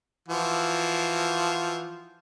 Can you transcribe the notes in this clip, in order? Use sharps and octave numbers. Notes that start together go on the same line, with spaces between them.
E3 F3 F#4